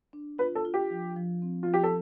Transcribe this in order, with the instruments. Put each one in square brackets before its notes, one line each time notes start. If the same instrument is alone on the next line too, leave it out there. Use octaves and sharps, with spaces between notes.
[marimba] D4
[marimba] F4 [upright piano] B4
[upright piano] A4
[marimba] F4
[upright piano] G4
[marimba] F3
F3
C4
[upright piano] F4
[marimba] F3
[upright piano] G4
A4